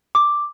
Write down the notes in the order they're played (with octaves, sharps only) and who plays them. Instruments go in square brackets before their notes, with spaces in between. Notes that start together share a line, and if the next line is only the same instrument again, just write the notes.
[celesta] D6